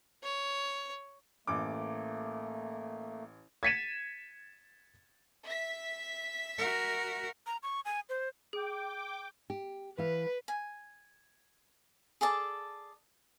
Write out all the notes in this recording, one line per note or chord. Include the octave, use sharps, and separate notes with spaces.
C#5
A1 A3 A#3 D6
G#6 A6 B6 C#7 D#7 E7
E5 B6
F#4 A#4
A#5
C#6
G#5
C5
G#4 G5 D6
G4
E3 B4 F5
G#5
G#4 A4 D5 A5